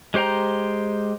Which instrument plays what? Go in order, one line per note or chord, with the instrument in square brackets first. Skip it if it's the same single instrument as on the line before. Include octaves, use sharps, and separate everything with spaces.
[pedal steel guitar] G#3 G4 C5 G5 A#5